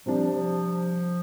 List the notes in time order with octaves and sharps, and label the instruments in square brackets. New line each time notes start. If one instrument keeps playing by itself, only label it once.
[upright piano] C3 G3 D4 [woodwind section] F3
[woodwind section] F3